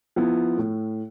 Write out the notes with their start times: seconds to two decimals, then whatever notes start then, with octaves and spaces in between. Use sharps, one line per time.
0.16 F3 B3 E4
0.57 A2